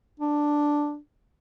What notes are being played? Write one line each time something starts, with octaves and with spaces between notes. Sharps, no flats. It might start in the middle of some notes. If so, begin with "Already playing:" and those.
D4